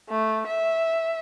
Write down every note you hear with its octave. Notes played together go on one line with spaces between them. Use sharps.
A3
E5